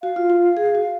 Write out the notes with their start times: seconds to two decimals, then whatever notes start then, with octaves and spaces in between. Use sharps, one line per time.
0.03 F#4 F5
0.16 F4
0.30 F4
0.57 G#4
0.75 F#4